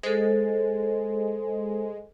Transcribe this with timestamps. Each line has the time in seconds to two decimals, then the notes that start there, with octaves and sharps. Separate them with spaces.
0.03 G#3 A4 C5